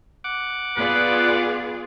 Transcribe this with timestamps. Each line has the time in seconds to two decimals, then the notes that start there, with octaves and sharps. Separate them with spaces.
0.24 F#5 D6
0.76 B3 F4 G#4 B4 D5